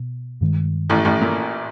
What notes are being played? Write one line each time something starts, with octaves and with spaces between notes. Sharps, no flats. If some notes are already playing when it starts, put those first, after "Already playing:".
Already playing: B2
G2 D#3 G#3
A1 A2
A1 A2
A#2